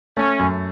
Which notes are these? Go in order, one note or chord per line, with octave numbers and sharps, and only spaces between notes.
A3 C#4
F#2